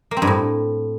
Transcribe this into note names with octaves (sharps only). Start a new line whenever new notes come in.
A#3
C4
G2
A2